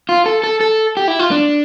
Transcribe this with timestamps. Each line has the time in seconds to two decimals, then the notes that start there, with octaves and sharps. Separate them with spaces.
0.09 F4
0.26 A4
0.44 A4
0.61 A4
0.97 G4
1.08 E4
1.19 F4
1.31 D4